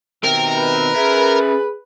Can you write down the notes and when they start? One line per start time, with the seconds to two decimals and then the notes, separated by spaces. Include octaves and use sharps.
0.24 B2 D#3 C4 G4 A#4
0.58 B4
0.96 C#4 G#4 E5